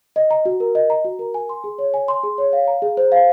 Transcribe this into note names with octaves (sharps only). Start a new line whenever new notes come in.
D#5
A#5
F#4
A#4
D#5
A#5
F#4
A#4
G#5
C6
G#4
C#5
G#5
C6
G#4
C#5
F5
A#5
G#4
C5
F5